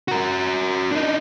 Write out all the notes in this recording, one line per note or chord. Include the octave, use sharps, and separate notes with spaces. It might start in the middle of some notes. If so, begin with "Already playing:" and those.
F#4 A#4
D4 D#4